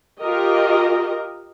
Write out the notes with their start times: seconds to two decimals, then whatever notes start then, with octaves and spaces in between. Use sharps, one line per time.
0.20 F4 G4 A#4 D#5